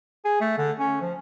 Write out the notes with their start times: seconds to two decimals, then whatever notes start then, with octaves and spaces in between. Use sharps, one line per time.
0.25 G#4
0.41 A3
0.58 D3
0.79 C#4
1.01 F3